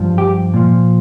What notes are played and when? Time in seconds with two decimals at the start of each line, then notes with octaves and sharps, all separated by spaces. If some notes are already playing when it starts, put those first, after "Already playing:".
Already playing: G2 F3
0.18 G4
0.54 A#2 F3